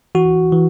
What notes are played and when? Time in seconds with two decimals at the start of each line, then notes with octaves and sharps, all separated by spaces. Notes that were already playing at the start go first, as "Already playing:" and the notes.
0.15 E3 F#4
0.52 E3